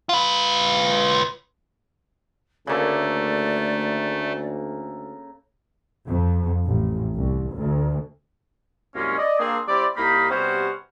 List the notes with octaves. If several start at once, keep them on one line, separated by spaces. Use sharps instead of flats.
F4 B4
D2 C#3 A3 A#3 A4 D5
F2
A1
C2
D2
C2 F#2 G#3 A#3 C#4
D5 D#5
A#3 C4 D4 G#4
G3 C4 E4 G4 C5 D5
C2 A#3 D#4 B5
C3 G3 B3 C#4 F#4 C5